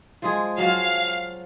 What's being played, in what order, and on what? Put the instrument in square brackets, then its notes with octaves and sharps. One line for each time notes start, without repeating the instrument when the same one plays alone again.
[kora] F3 G#3 G#4
[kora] F3 F#3 [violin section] F5